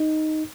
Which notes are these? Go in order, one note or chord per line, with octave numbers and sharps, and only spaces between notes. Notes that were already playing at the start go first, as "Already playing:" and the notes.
Already playing: D#4